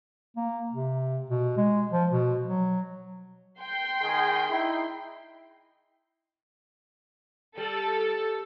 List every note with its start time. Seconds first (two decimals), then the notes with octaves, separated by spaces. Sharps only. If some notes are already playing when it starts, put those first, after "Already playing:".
0.36 A#3
0.71 C3
1.30 B2
1.57 G#3
1.91 F3
2.12 B2
2.48 F#3
3.60 G5 C6
4.01 D#3 G#4
4.50 D#4 E4
7.57 G3 A4